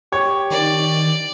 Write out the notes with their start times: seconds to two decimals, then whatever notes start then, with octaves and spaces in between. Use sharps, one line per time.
0.12 G4 C#5
0.51 D#3 D5